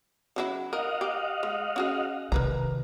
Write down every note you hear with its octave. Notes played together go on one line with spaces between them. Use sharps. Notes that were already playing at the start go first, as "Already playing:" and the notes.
C#3 F#3 E4
A#4 D#5 F5 F#5
G4
G#3
C#4 F#4 G#4
C3 D#3 A#4 B4 A#5